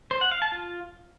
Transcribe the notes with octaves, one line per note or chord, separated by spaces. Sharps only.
C5
F#5
F5
A5
F4